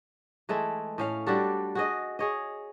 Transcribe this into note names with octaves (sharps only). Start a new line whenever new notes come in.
E3 G#3 A3 E4
A2 C#4 F5
G3 D4 F#4 A4
F#4 G#4 D#5
G#4 C#5 D#5